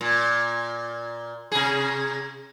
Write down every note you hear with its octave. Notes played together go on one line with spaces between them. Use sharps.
A#2
C3 G#4